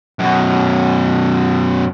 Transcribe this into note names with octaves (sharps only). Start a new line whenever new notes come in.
F#2 B2